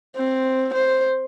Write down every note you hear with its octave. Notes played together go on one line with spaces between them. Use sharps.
C4
C5